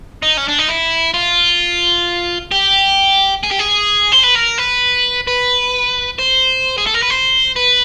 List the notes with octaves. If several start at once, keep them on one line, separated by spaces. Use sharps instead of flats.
D#4
C#4
D4
D#4
E4
F4
G4
G#4
G4
G#4
C5
B4
A#4
B4
B4
C5
G#4
A4
A#4
B4
C5
B4